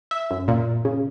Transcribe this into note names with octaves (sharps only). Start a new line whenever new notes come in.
E5
F#2
A#2
C#3